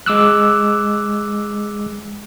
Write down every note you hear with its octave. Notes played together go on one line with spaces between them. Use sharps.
G#3 D6 E6 F#6